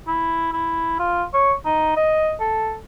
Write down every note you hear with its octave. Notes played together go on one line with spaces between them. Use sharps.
E4
E4
F4
C#5
D#4
D#5
A4